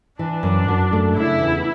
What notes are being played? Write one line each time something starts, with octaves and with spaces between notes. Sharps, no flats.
E3 D4
F#2
F#2
A3
C#3 E4
E2